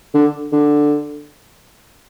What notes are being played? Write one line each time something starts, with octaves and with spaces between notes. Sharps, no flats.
D3
D3